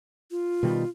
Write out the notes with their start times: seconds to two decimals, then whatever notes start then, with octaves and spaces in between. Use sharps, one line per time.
0.31 F4
0.63 B2 D#3 G3